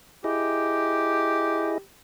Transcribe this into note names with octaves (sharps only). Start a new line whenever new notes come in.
E4 G4 G#4 D#5